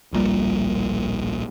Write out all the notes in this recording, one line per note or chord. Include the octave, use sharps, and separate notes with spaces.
D1 A#1 A#2 G3